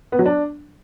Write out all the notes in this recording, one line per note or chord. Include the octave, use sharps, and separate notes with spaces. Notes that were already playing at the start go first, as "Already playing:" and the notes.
B3
F#3
D4